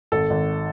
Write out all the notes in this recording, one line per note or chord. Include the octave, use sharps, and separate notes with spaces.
G#1 A4
G#1